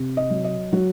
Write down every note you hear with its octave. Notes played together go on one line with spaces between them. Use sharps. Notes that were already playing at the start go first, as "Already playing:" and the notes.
Already playing: C3
D#5
F#3
D#5
F#3 F#4